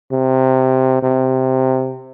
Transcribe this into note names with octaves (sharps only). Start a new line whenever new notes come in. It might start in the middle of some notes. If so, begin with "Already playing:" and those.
C3
C3